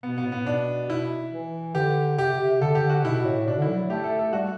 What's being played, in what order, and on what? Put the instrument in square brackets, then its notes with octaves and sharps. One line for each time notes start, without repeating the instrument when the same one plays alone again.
[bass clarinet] B2 [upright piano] B3
[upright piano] B3
[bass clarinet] A2
[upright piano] B3
[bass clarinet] B2 [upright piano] D4
[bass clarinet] B2 [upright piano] E4
[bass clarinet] E3
[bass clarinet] D3 [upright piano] G4
[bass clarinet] C3 [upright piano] G4
[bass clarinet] C3
[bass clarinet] D3 [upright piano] A4
[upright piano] G4
[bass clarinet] D3
[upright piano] F#4
[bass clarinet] B2 [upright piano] E4
[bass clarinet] A2
[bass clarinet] B2 [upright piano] D4
[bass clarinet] D3 [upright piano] E4
[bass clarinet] F#3
[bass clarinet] A3 [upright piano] G4
[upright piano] A4
A4
[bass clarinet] G3 [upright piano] F#4